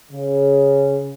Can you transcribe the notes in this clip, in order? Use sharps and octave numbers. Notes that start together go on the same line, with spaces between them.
C#3